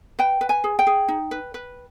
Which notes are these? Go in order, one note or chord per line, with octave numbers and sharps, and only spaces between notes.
B4 G5
B4
G#5
G#4
G5
G#4
D#4
B4
B4